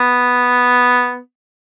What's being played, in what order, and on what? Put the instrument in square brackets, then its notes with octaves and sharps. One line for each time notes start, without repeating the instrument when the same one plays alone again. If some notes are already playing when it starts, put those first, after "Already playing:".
Already playing: [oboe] B3